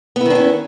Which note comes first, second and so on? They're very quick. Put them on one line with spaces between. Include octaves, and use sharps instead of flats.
B3 E4 D#3 D4 C#4